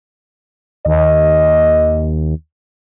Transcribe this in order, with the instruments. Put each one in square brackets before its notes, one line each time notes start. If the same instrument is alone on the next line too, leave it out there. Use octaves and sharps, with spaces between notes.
[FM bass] D#2 [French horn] D#5